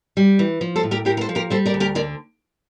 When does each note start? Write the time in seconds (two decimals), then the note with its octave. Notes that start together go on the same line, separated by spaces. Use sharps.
0.17 G3
0.39 E3
0.61 F3
0.76 A4 C5
0.83 A2
0.91 G4 A#4
1.05 A2 G4 A#4
1.17 A#4
1.21 A4 C5
1.29 F3
1.35 G4 A#4
1.50 G3 A4 C5
1.66 A#4 D5
1.74 D2
1.80 G4 A#4
1.95 D3 A#4 D5